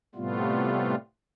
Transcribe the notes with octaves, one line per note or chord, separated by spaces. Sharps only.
A2 C3 G3 A3 B3 F4